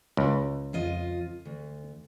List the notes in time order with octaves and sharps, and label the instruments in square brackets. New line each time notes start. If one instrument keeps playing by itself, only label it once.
[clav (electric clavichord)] C#2
[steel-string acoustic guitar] F2 F4 D#5
D2